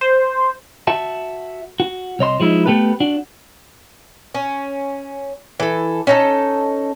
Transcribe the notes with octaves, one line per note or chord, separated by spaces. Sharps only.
C5
F#4 E5 A5
F#4
C2 C#5 D#5 C6
F3 G#3 D#4 E4
A3 B3 G4 A4 B4
D4 F#4
C#4
E3 A4
C#4 D#4 A4